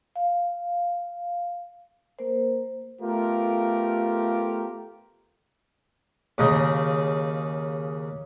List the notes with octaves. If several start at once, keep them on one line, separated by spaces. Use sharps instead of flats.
F5
A#3 A#4 C5
A3 B3 F4 G4 A#4
D#2 C#3 D#4